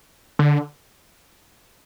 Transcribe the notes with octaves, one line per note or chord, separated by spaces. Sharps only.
D3